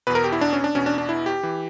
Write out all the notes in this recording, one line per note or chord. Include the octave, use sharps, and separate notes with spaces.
E2 B2 B4
A#4
G4
E4
D4
C#4
D4
E2 B2 C#4
D4
D4
E4
G4
E3